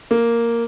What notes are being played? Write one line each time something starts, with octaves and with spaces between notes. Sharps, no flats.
A#3